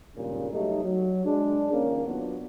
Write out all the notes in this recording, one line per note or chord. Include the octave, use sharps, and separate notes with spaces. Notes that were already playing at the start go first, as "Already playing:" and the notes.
G#1 G2 A#2 C#3
F#3 G3 A3 D#4
F#3
G#3 D4
C#2 D#3 A#3 C#4
F#3 B3 D4 F4 F#4